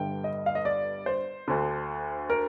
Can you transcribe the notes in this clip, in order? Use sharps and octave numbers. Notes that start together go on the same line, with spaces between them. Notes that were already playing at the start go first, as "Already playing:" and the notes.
Already playing: G1 G2 D3 G5
D#5
F5
D#5
D5
C5
D2 D3
A#4